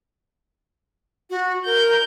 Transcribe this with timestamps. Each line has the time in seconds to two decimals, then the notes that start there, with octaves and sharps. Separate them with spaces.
1.30 F#4
1.66 A#4 G6